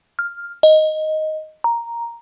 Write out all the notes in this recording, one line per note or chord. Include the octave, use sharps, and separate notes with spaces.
F6
D#5
A#5